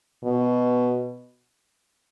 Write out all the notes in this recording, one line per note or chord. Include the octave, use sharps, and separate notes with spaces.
B2